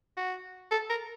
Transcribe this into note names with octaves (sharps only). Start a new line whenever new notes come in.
F#4
A4
A#4